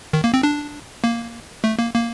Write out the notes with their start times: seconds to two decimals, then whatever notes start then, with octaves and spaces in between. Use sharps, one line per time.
0.13 D#3
0.24 A#3
0.34 C4
0.43 D4
1.04 A#3
1.64 A3
1.79 A#3
1.94 A#3